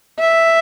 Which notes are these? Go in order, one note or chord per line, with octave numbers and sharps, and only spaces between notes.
E5